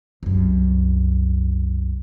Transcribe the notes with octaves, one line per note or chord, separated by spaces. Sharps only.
C2 F#2